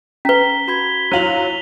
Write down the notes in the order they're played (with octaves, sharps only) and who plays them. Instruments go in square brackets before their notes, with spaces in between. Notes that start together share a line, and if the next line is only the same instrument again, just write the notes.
[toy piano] C#4 B4 [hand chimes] A#5 [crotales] B6 G7
[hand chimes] F#4 B5 G#6
[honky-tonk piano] F#3 F4 [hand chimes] E4 [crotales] D#7 F7 F#7